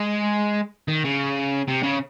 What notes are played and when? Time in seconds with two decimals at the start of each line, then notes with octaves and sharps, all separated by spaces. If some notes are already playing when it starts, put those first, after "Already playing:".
Already playing: G#3
0.88 D#3
1.05 C#3
1.68 C3
1.83 C#3